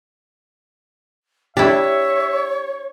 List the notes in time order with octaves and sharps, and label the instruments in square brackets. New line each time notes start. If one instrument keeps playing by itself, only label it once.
[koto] D4 E4 [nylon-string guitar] G4 [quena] C#5 [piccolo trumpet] E5